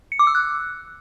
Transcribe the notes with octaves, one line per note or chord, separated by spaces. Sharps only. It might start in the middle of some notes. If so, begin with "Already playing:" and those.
C#7
D6
E6
F#6